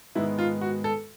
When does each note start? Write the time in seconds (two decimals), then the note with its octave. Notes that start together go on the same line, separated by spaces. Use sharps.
0.15 G#2 D#3 G#3 B3 E4
0.39 F4
0.61 F#4
0.84 A4